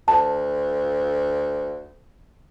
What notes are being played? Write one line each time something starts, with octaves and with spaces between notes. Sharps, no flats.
D2 A5